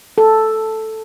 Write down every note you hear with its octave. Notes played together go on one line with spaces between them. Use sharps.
A4